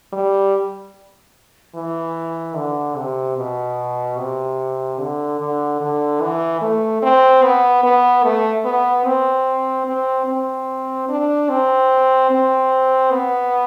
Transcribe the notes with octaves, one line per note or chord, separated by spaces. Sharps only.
G3
E3
D3
C3
B2
C3
D3
D3
D3
E3
A3
C4
B3
B3
A3
B3
C4
C4
C4
D4
C4
C4
B3